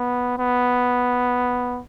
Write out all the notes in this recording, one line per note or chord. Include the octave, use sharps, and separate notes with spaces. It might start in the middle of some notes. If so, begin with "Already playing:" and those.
Already playing: B3
B3